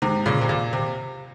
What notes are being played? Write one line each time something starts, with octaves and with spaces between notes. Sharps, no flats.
G#2 C3
A#2 C#3
C3
A#2
C3